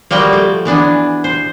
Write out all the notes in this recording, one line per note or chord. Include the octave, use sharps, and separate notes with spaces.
F3 G3 A#3 F#4 G5
A3
E3 B3 D4 G#5
C5